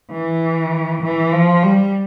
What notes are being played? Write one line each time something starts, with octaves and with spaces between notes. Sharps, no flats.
E3
E3
F3
G3